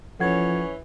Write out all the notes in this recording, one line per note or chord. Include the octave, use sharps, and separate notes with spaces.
E3 F3 C#4 A4 F#5 G#6